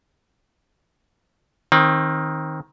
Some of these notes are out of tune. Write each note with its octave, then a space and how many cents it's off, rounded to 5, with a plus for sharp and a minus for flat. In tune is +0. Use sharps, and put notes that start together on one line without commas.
D#3 +15 C4 +30